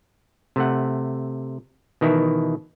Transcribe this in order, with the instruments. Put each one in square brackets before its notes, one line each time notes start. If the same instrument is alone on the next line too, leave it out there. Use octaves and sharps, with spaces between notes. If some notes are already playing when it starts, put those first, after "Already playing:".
[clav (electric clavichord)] C3 A3 F#5
B2 D#3 E3 E4